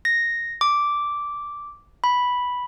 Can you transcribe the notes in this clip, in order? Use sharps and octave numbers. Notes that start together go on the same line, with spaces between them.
A#6
D6
B5